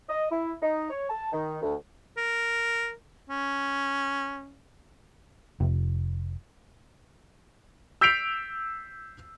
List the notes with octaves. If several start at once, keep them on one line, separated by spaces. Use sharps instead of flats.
D#5
E4
D#4
C#5
A5
D#3
D2
A#4
C#4
F1
E6 G6 B6 C7 D7 F7